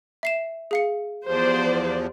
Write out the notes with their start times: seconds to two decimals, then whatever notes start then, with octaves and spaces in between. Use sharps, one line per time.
0.23 E5 C7 E7
0.71 G#4 F5 C#7
1.27 E2 F3 G4 C5 D5